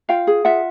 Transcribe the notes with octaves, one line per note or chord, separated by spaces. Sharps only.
F4 F5 G5
G#4
F4 E5 F#5